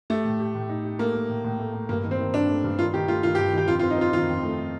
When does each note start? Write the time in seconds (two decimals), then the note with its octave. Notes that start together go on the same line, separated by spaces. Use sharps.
0.10 A3 G4
0.25 A2
0.40 G4
0.55 A2
0.69 D#4
0.84 G4
0.99 A3 A#3
1.14 A3
1.29 A2
1.44 A2
1.59 A3
1.74 A3
1.89 G2 A#3
2.03 D#3
2.11 C4
2.19 D#3
2.34 G2 D4
2.49 A3
2.64 G2
2.79 D#3 F4
2.94 D#3 G4
3.08 A3 F4
3.23 D#3 F4
3.35 G4
3.38 G2
3.53 D#3 G4
3.68 F2 F4
3.79 F4
3.83 C4
3.90 D#4
3.98 C4 F4
4.13 D#3 F4
4.29 F2
4.43 A3